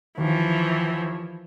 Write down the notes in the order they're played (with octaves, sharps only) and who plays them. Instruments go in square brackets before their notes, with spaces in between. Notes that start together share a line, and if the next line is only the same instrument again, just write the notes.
[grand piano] D#2 [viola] E3 F3